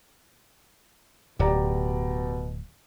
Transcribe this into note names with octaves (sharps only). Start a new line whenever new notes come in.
D1 B2 G4 D5 A#5